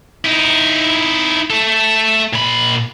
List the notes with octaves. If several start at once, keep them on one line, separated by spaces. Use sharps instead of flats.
D#4 E4
A3 A4
A#2 B5